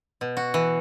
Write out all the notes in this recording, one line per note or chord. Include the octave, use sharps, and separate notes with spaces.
B2
F#4
E3